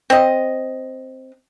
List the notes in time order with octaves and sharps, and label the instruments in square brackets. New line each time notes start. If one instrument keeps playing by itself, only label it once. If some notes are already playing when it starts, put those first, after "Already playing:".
[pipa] C4 D#5